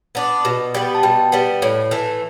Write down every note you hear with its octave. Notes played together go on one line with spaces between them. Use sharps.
B3 D4
B2
G3 B3
A5
B2 G5
G3 B3
A2
E3 A3